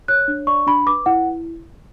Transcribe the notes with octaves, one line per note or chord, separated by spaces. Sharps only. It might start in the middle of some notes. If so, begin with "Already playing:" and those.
C#5 F#6
D4
D5 C#6
D4 B5
B4 D6
E4 F#5